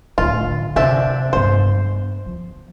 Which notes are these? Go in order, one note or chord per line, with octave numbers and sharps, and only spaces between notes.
A2 D3 F4
C3 C4 D4 E5
G2 B3 C5
F3